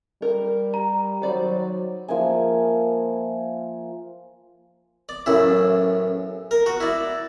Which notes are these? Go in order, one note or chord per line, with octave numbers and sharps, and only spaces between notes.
G3 A#4
A#5
D#3 F#3 C5 D5 B5
F3 A#3 E5 G#5
D5
A1 F#2 E4
A#4
F#4
E4 D5